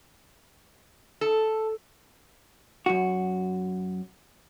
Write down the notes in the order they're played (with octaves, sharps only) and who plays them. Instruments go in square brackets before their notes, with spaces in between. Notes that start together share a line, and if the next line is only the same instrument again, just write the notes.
[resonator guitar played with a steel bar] A4
[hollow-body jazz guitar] F#2 F#4